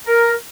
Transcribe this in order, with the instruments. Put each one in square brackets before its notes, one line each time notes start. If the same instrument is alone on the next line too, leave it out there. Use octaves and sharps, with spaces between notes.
[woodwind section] A#4